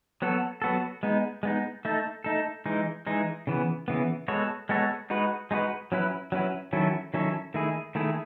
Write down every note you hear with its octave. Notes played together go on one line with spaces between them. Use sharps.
F#3 B3 F#4 A4
F#3 B3 F#4 A4
G#3 B3 D#4
G#3 B3 D#4
A3 D#4 A4
A3 D#4 A4
E3 G#3 D#4
E3 G#3 D#4
C#3 E3 B3
C#3 E3 B3
G#3 B3 F#4 A4 C#5
G#3 B3 F#4 A4 C#5
G#3 D#4 F#4 B4
G#3 D#4 F#4 B4
F#3 C#4 E4 B4
F#3 C#4 E4 B4
D#3 F#3 C#4 E4 A4
D#3 F#3 C#4 E4 A4
D#3 A3 E4 G#4
D#3 A3 E4 G#4